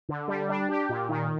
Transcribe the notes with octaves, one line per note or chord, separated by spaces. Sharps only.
D3
G3
D4
G4
A#2
D#3